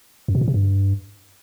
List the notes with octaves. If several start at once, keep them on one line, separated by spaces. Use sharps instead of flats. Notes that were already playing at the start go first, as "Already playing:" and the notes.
F#2
B2
A#2
C3
G2